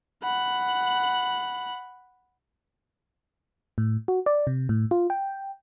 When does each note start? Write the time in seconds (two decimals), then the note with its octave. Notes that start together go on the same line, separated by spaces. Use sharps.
0.23 F#5 B5
3.78 A2
4.08 F#4
4.26 D5
4.47 C3
4.69 A2
4.91 F4
5.10 G5